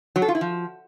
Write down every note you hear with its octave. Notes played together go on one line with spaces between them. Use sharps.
F#3
A4
F4
E4
F3